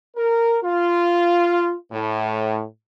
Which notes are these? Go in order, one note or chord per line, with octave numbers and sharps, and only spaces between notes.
A#4
F4
A2